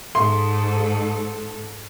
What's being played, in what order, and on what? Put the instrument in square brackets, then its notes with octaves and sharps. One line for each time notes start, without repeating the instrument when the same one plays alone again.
[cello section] G#2 A4 [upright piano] C6